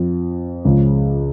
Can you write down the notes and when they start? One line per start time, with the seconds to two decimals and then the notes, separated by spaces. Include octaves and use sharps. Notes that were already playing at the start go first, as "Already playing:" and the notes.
Already playing: F2 F3
0.64 C#2 C#3 F3